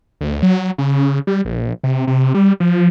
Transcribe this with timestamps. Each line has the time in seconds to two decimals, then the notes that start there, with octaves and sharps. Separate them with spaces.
0.21 D2
0.43 F#3
0.78 C#3
1.27 G3
1.45 A#1
1.84 C3
2.07 C3
2.34 G3
2.60 F3